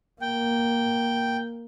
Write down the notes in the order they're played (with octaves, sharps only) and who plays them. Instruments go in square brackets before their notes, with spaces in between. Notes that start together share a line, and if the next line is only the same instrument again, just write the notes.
[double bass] A#3 [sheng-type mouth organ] G5